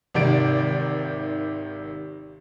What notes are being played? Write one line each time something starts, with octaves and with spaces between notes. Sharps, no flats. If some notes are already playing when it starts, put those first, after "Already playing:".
G#1 C3 D#3 D5 D7